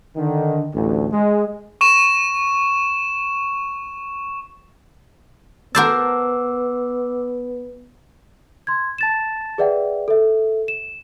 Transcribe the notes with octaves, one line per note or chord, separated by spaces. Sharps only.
D3 D#3
A1 D2
G#3
C#6 E7
B3 A#4 C5 F#5 A5 D6 E6
C6 G#6
A5 A6 E7
G#4 B4 D5 E5 F#5 G5
A4 E5
E7